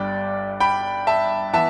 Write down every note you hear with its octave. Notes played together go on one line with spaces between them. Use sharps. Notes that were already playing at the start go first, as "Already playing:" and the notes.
Already playing: G1 G2 G3 D5 G5
G5 B5
E5 A5
E3 B3 E5 A5